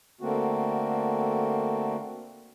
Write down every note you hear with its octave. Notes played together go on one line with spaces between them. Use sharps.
D3 A3 A#3 C4 F#4